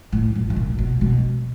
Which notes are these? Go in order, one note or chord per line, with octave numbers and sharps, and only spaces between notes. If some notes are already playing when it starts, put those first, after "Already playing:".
A2
A#2
B2
A#2
B2
B2